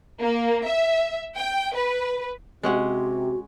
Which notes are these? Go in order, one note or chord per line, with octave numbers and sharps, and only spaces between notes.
A#3
E5
G5
B4
C3 G#3 C#4 F#4 F#5